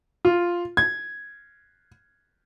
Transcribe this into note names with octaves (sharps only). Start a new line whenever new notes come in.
F4
G#6